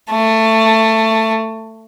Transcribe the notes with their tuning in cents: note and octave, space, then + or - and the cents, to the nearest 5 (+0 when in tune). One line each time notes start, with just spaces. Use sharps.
A3 +15